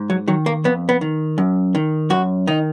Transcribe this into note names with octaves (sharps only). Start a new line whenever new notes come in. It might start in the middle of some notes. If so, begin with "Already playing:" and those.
Already playing: G#2
F#3
D#3 F#3
A#3
F2 B3
B3
D#3
F#2
D#3
F#2 F#4
D#3 D#4